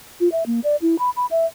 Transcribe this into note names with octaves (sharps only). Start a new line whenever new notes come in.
F4
E5
A#3
D5
E4
B5
B5
E5